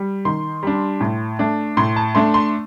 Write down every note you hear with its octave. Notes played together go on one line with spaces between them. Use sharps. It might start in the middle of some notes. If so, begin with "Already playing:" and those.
Already playing: G3
D#3 C6
G3 D4
A2
A3 D4
A2 C6
A5
A3 D4 C6
C6